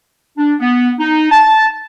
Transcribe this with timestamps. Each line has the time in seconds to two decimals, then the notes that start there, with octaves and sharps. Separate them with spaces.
0.38 D4
0.60 B3
1.00 D#4
1.31 A5